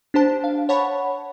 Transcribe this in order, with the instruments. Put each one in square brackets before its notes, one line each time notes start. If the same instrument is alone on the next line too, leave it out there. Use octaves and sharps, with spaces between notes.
[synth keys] D4 G4 C5 A5
F5
C#5 F#5 A5 B5 C#6